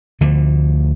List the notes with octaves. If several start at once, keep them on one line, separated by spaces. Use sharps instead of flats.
D2 D3 F3 A3